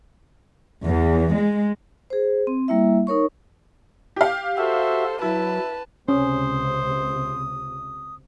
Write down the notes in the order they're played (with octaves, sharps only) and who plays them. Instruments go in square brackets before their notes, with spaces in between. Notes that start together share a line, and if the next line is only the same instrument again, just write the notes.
[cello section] E2
G#3
[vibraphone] G#4 C5
C4
G3 A#3 E4 E5
D#4 A#4 C#5 C#6
[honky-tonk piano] G4 F5
[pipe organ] F#4 E5 [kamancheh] A4 C5
[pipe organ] F#3 [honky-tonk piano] E4 [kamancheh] B4 A5
[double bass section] C#2 C3 [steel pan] C#4 [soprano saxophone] C5 [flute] D#6